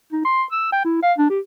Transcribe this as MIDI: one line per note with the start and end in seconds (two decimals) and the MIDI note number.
0.13 0.22 63
0.25 0.43 84
0.52 0.69 88
0.72 0.83 79
0.85 0.97 64
1.03 1.13 77
1.18 1.29 62
1.30 1.40 67